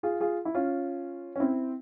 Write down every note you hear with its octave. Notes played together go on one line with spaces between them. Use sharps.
F4 G#4
F4 G#4
E4
C#4 F4
C#4
C4 E4